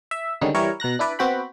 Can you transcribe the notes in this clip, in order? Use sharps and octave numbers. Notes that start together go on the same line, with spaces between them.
E5
D3 D#3 G3 G#3 C#4 D#4
E3 G3 E4 A#4 C#5
B2 A#5 F#6 A#6
D4 E4 B4 D5
B3 C4 F#4 G5 B5